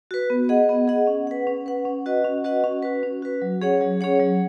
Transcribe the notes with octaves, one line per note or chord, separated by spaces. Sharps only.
F#4 B4
B3
G#4 D#5 F#5
B3
G#4 D#5 F#5
C#4
B4 F#5
C#4
B4 F#5
C#4
F#4 B4 D#5 F#5
C#4
F#4 B4 D#5 F#5
C#4
F#4 B4
C#4
F#4 B4
F#3
C#4 G#4 C#5 F#5
F#3
C#4 G#4 C#5 F#5
F#3